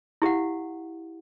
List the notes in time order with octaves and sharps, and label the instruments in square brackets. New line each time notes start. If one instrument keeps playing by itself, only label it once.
[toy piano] E4 G4 F5 F#5